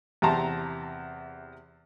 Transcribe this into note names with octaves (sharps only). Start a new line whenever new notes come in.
E2 C3 G5 A5 A#5 C6